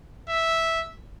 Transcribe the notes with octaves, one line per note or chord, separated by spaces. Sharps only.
E5